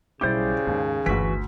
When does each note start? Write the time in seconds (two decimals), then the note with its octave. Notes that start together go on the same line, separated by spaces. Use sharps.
0.21 B1 C#3 G3 E4 G4 C5 D5
0.67 D#2 G#2
1.06 G1 D2 E3 A3 F#4 B6